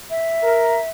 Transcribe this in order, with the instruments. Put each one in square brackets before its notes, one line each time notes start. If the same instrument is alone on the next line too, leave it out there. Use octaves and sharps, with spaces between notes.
[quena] E5
[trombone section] A#4